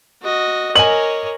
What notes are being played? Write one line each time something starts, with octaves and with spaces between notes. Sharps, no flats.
F#4 D#5
A#4 C#5 D#5 G#5 F#7